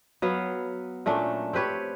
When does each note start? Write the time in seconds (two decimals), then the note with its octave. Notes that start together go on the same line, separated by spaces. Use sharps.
0.22 F#3 B3 F5
1.06 A#2 A3 C#4 D4
1.53 C4 G4 B4 C#5